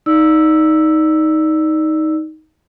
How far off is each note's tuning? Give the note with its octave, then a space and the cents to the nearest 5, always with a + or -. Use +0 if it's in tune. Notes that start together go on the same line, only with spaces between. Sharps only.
D#4 +10 D5 +5 E6 +0